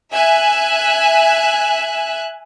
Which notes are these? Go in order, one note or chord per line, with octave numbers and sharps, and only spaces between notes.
E5 G#5 F#6